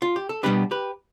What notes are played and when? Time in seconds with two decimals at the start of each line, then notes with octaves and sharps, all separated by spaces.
0.02 F4
0.16 G4
0.29 A4
0.43 B2 G3 B3 D4 G4 B4
0.71 G4 B4